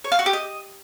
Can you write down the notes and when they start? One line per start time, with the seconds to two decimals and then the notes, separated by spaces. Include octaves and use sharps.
0.04 C#5
0.12 F5
0.19 F#4
0.26 G4
0.33 D#5